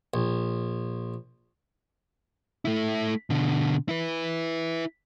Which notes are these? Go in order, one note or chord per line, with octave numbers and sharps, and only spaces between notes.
A#1
A3 E4
B2 D3
E4 B4